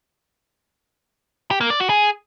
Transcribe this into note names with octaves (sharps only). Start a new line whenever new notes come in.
G4
A#3
D5
F#4
G#4